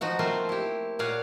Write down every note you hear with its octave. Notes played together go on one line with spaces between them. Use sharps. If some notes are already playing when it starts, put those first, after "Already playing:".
F3 D#4 F#4 F#5
A3 A#3 C4 F4 C5
E4 G4
A#2 C#5 D5 F5 F#5